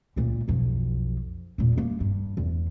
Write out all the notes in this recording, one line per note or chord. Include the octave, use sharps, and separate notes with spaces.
C#2 A#2
B1 F2
E2 A#2
G3 A#3
G2
E2